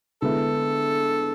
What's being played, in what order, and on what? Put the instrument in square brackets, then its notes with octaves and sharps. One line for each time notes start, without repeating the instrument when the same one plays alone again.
[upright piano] D3 G#3 B3 E4 [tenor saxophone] A4